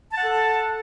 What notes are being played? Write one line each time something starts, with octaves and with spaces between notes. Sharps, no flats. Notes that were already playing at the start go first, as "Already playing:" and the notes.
A4 F#5 A5